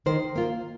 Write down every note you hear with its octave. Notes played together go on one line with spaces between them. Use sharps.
D#3 C5
A#3 F4